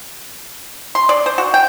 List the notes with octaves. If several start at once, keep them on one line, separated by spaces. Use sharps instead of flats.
C6
D5
C5
F#4
G5